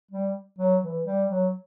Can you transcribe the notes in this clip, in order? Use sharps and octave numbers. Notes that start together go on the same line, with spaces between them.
G3
F#3
E3
G3
F#3